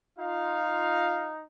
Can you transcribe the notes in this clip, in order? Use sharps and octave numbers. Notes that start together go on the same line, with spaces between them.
D#4 F4 F5